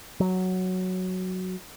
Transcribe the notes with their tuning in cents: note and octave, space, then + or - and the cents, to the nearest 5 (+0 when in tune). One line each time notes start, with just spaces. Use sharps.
F#3 +0